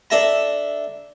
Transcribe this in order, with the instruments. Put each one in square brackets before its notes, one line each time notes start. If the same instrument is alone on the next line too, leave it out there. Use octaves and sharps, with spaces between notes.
[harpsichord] D4 A4 E5 A5 A#5